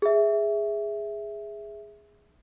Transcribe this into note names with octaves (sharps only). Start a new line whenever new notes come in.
G#4 E5